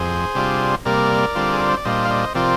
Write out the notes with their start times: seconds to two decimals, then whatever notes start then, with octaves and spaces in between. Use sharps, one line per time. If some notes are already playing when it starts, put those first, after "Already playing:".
Already playing: F2 G#4 C5
0.35 C3 G3 D4 F4
0.85 C3 G3 A#3 A#4 D5
1.35 D3 G3 C4 F4
1.52 G#4
1.60 A#4
1.69 C5
1.77 D5
1.85 A#2 G3 D4 F4 C5 D#5
2.05 F5
2.10 C5 D#5
2.35 C3 F3 C4 F4 A#4 D5